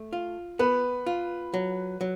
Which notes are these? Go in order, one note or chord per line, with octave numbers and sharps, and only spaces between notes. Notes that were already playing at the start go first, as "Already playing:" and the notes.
Already playing: A3
F4
B3 B4
F4
F#3
F#3